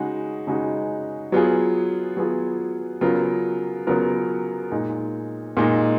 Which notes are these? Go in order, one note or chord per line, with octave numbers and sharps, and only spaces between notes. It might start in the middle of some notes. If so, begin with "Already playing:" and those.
Already playing: C#3 G#3 D#4 F#4
C#3 G#3 D#4 F#4
F#3 B3 F4 G#4
F#3 B3 F4 G#4
C#3 F#3 B3 F4 A#4
C#3 F#3 B3 F4 A#4
A#2 G#3 D#4
A#2 G#3 D#4